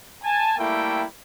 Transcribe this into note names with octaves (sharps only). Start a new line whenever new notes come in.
G#5 A5
G3 A3 A#3 E4 A4 G5